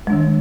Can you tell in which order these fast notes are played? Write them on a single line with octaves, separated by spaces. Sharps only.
G#3 D4 D#3